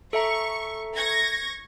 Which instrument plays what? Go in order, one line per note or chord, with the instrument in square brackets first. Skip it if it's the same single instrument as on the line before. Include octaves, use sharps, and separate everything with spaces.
[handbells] A4 E5 A#5 [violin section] C#6
[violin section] C#6 G#6 A#6